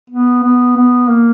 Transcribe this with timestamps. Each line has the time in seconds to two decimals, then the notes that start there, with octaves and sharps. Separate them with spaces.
0.10 B3
0.44 B3
0.76 B3
1.10 A#3